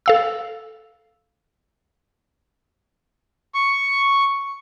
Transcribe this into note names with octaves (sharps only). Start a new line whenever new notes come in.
A4 F5 E6
C#6